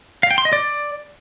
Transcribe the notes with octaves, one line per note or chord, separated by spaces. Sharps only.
F5
G5
C6
D#5
D5